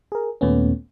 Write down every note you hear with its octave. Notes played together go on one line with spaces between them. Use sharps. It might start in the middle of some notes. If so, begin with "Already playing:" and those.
G#4 A#4
D#2 A#2 A3 B3 C#4